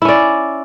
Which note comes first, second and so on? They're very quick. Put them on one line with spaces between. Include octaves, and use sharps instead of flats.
E4 C#4 D5